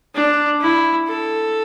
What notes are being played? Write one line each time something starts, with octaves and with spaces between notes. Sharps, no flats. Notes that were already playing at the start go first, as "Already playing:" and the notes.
D4
E4
A4